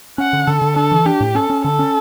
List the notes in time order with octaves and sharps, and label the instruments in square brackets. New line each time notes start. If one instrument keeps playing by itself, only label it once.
[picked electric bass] C#4 [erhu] F#5
[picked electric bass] D3
[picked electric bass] D3 [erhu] A4
[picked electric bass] D3
[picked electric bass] D4 [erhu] A4
[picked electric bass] E3
[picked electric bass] D4 [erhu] G4
[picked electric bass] A2
[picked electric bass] C#4 [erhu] A4
[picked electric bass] C#4
[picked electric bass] D3 [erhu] A4
[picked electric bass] C#4